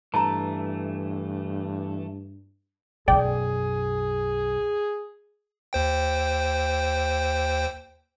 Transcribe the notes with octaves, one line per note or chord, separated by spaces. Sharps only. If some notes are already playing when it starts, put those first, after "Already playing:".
G2 E3 A3 A5 A#5
B1 F#2 G#4 D5 G5
D#2 C5 G5